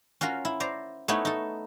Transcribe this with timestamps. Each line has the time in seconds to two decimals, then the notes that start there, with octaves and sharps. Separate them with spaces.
0.21 C#4 F4 F#4 A#4
0.45 E4
0.60 C5 D5 A#5
1.08 A3 B3 D#4 E4 C#5
1.25 D#4 A4